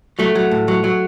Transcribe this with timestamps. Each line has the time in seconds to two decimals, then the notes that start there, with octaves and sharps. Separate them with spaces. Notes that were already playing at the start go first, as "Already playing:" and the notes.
0.19 F#3 A3
0.35 F#3
0.51 A2
0.68 F#3
0.84 F#3